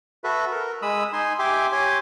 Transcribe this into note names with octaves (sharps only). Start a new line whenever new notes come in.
F#4 A4 B4 E5
A#4
G#3 B5 D#6 E6
D#4 G#5 C6
G4 E5 G5 G#5 C6 D6
G4 C#5 G#5 C6 D6